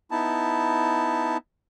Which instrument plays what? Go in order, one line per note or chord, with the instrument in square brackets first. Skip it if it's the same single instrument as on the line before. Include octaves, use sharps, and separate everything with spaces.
[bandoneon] B3 D#4 E4 A5